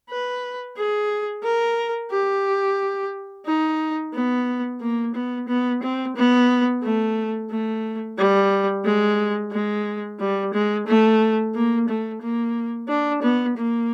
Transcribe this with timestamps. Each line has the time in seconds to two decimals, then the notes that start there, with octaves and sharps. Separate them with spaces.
0.10 B4
0.77 G#4
1.43 A#4
2.11 G4
3.46 D#4
4.14 B3
4.81 A#3
5.14 B3
5.48 B3
5.82 C4
6.16 B3
6.82 A3
7.50 A3
8.18 G3
8.85 G#3
9.52 G#3
10.19 G3
10.53 G#3
10.87 A3
11.54 A#3
11.88 A3
12.22 A#3
12.88 D4
13.22 B3
13.57 A#3